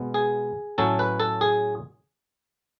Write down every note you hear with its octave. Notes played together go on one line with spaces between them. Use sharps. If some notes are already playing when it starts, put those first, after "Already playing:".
Already playing: B2 G#3 B3
G#4
A2 F#3 C#4 A4
B4
A4
G#4